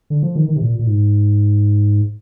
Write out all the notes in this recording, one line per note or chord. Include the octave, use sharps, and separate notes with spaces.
D3
F3
D#3
D#3
C3
A#2
A#2
G#2